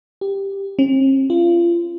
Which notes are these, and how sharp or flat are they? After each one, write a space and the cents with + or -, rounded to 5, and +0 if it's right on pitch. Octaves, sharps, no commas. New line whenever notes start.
G4 +5
C4 +45
F4 -30